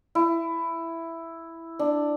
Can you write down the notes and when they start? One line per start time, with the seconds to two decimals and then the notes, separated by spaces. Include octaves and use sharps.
0.15 E4
1.79 D4